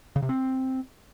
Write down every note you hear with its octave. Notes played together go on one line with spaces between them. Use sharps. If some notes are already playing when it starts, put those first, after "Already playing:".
C#3
C3
C4